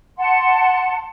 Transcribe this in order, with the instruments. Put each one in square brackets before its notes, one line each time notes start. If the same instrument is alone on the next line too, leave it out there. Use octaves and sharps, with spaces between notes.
[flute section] F#5 A5 C6